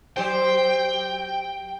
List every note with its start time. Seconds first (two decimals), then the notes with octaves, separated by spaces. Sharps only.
0.17 F#3 G4 C5 G5